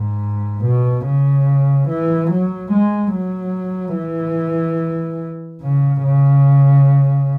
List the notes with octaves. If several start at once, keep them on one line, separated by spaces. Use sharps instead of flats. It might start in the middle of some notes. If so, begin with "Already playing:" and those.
Already playing: G#2
B2
C#3
E3
F#3
G#3
F#3
E3
C#3
C#3